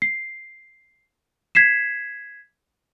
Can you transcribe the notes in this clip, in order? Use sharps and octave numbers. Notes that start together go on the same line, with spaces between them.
C7
G#6 B6 C7 E7